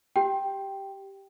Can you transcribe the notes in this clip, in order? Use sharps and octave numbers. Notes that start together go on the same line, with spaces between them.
G4 G5